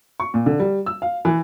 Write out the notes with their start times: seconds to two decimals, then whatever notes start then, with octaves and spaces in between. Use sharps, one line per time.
0.20 C#6
0.34 A#2
0.46 D3
0.60 G3
0.86 E6
1.02 F5
1.25 E3